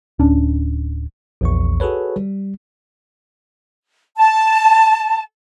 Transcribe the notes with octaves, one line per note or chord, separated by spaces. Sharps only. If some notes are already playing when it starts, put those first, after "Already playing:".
D1 C#4 D4
A#1 E2 C#6
F#4 G#4 A4 B4 C#5
G3
A5